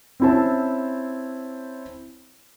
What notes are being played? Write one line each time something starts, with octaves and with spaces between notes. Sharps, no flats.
C4 C#4 E4 C5 A5